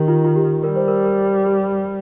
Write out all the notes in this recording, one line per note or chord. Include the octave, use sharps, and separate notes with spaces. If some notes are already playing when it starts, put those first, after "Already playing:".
Already playing: D#3 G4
F4
F4
G4
G3 A#4
C5
A#4
A#4
G4